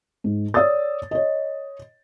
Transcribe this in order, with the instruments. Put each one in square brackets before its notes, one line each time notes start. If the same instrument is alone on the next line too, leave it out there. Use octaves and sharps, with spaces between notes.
[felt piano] G#2
C#5 D5 D#6 E6 A6
C#5 D#5